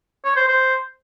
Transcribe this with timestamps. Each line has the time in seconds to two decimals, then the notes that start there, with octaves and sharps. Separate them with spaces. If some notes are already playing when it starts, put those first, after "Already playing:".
0.25 C#5
0.36 C5
0.48 C5